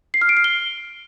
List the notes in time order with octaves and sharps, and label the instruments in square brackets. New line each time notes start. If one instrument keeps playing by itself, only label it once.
[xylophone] C7
F6
D7
C7
G7